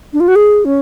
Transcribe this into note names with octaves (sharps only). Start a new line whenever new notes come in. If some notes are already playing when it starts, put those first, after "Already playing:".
D4
F4
F#4
G#4
C#4